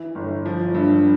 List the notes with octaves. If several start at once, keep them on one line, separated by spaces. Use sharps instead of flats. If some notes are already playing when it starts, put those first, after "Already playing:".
Already playing: E3
G1
F3
G2